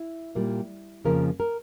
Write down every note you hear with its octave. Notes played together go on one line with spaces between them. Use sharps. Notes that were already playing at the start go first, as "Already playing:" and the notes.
Already playing: E4
A#2 G3 A#3
F2 C#3 F3 A#3 A#4
A#4